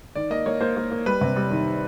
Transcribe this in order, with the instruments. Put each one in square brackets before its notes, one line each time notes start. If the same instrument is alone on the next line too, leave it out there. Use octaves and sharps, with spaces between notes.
[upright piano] D#3 [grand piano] D5
[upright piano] A#3 [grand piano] D#5
[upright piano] A#3 [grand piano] C#5
[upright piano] A#3 [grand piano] C5
[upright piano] A#3
A#3
[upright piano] G3 [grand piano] B4
[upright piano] C3
G3
D#3